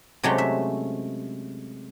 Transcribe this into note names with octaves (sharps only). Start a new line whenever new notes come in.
C3 F#3 G#3 A3 C#4 G4
E5